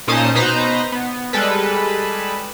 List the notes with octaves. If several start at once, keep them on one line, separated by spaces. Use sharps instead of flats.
A#2 C#4 D#4 C5 A5 D#6
B2 D#4 B4 C5 A#5
B3
G3 G#3 A4 B4